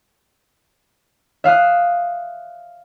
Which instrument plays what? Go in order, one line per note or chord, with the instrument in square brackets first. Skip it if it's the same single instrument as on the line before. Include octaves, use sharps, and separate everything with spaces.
[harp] E5 F5 D#6 F#6